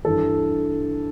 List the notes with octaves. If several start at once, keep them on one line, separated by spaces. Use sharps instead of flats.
G2 E3 A4